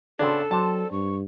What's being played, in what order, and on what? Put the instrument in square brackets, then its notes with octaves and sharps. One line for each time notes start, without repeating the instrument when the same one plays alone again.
[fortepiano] C#3 D4 [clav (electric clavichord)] B3 C4 [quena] A4
[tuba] F#3 [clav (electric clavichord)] C4 D4 [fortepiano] A5
[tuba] G2 [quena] C#6